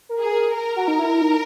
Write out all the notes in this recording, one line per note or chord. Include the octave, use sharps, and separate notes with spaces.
A#4
G#4
A#4
A#4
F#4
D#4
E4
D#4